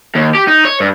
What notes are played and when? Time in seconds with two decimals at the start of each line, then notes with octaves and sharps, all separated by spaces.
0.15 D#2
0.34 G4
0.47 D#4
0.65 C#5
0.80 G2